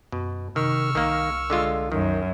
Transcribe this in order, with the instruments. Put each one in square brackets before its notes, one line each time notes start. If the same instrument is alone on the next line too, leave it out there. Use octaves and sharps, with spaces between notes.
[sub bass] F#2 [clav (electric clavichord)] B2
[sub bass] C3 [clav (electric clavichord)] D#3 [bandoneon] C#6 E6 F6
[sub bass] C2 [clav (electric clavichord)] D#3 A#3
[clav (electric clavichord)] D3 G#3 F4
[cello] F#2 [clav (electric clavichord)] D#3